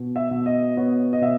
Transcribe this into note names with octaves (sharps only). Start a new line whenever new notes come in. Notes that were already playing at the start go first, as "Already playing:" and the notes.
Already playing: B2
E5
B2
D#5
B3 C#5
D#5
B2 E5